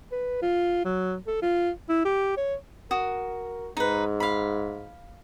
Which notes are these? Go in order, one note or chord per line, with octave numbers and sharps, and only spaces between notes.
B4
F4
F#3
A4
F4
E4
G4
C#5
F#4 A#4 D#6
G#2 D#4 B4
F5 B5